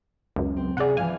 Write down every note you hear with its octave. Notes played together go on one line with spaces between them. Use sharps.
C#2 F#2
C4
C3 G#4 D5 F#5
E3 F3 F5 G#5